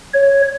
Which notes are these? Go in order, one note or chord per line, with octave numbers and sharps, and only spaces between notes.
C#5